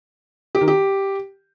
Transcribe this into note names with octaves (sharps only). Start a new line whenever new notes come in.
G4
D#3
G4